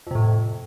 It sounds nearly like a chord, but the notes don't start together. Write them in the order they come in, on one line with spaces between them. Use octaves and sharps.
F2 C3 A2